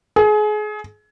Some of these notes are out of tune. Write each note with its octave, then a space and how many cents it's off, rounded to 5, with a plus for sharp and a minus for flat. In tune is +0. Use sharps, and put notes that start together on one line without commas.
G#4 +30